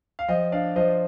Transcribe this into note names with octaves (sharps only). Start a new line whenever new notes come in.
F5
F3 D#5 G5
D4 D5 F5
F3 C5 D#5